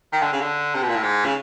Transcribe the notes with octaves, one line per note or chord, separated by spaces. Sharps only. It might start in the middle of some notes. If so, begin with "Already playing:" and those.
D#3
D3
C#3
D3
C3
B2
A#2
A2
G#2
C#3